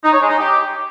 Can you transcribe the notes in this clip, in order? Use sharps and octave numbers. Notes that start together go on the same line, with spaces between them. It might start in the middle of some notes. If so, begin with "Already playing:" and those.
D#4
C#5
G#3
D#4
G4